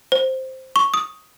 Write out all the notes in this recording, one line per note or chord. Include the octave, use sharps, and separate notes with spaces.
C5
C#6
D#6